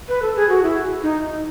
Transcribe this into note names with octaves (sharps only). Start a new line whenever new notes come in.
B4
A4
G#4
F#4
E4
D#4